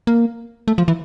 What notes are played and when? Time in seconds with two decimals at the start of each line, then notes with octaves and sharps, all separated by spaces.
0.07 A#3
0.68 A3
0.78 F3
0.88 E3